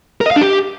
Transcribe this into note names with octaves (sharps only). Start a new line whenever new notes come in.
A#4
D#5
F5
D4
G4